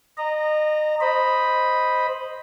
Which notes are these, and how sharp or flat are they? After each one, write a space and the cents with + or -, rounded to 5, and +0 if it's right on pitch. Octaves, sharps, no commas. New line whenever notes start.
D#5 -30 A#5 -10
C5 +0 D#5 +0 B5 +0